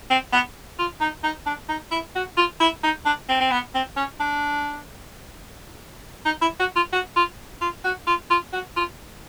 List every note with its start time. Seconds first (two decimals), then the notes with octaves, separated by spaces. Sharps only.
0.10 C4
0.33 B3
0.79 F4
1.01 D#4
1.24 D#4
1.46 D4
1.69 D#4
1.91 E4
2.15 F#4
2.37 F4
2.60 E4
2.83 D#4
3.05 D4
3.29 C4
3.40 C4
3.51 B3
3.74 C4
3.96 C#4
4.20 D4
6.25 D#4
6.41 E4
6.59 F#4
6.76 F4
6.92 F#4
7.16 F4
7.61 F4
7.84 F#4
8.07 F4
8.30 F4
8.52 F#4
8.76 F4